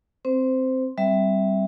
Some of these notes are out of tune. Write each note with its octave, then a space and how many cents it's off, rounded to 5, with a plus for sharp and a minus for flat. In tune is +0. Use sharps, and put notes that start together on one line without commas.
C4 +0 C5 -15
G3 -10 C4 +0 E5 +0